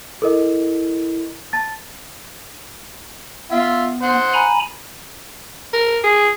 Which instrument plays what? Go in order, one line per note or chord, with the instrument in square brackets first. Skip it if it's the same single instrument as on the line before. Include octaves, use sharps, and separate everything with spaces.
[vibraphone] E4 [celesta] A4 A#4 D#5
[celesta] A5 A6
[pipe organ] B3 [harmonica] F4 E5
[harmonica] C5 F#5
[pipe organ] G#5 A#5 B5
[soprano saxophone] A#4
G#4